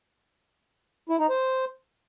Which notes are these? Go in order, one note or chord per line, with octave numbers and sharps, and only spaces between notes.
E4
D#4
C5